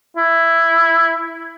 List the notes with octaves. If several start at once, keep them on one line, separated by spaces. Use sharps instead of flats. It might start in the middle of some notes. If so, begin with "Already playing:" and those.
E4